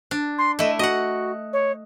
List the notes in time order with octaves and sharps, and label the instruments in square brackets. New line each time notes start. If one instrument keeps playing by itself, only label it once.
[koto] D4
[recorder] C6
[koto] A3 E4 [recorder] D#5
[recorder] F#4 [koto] D#5 F#5
[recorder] C#5